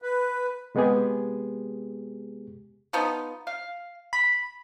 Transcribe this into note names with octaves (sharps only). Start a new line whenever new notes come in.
B4
C3 G#3 B3 G4 G#4
F3 B3 D#4
F5
B5